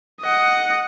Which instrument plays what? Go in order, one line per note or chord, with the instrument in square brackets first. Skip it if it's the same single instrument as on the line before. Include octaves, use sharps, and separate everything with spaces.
[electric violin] D#5 F#5